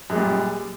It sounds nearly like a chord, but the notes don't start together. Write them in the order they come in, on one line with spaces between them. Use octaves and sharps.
F#2 G#3 A#2 G3